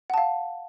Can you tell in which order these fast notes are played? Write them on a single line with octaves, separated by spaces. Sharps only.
F#5 A5 F5